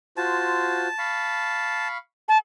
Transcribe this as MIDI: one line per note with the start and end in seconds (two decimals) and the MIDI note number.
0.17 0.87 65
0.17 0.87 66
0.17 0.87 72
0.17 1.88 81
0.99 1.98 77
0.99 1.98 83
0.99 1.98 85
2.29 2.38 81